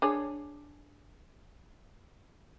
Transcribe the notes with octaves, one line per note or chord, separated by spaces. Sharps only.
D4 G#4 C#5